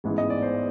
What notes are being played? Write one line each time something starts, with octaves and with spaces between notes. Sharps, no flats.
A1 G#2 E3 G#3 B3
D#5
D5
C5